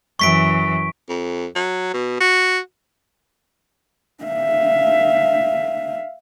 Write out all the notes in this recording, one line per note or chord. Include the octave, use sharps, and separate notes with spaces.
F#2 E3 C#6 B6 D7
F2
F#3
B2
F#4
E5 F5